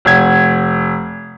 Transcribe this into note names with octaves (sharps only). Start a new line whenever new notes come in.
F1 G#6